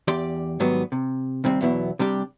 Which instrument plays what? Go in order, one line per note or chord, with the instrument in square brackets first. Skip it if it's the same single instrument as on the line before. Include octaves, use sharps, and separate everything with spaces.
[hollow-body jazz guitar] E2 G4 D5 C6
G#2 D#3 F#3 G3 B3
C3
D#2 C3 G3 C4
E2 B2 F#3 B3 E4
C3 G3 D4 G4